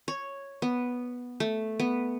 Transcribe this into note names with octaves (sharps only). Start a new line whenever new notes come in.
C#5
B3
A3
B3